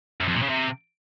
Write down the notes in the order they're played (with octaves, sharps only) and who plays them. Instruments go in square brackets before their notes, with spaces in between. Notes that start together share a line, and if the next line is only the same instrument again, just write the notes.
[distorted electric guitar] F#2
F2
A#2
C#3
C3